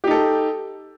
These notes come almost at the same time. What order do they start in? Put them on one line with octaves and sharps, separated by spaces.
G4 D#4 A4